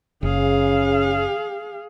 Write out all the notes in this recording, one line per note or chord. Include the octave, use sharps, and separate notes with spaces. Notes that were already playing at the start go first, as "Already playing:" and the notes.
F#1 C#3 G#4 F5